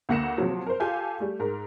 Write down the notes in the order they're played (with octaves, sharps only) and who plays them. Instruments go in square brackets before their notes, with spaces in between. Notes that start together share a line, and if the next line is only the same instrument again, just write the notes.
[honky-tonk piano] D2 A#3 F#5 A#6 C#7 E7
C3 F3 F#3
A#4 C5
F4 G4 A4 F5 G#5 G6
G3 A3
G#2 A#4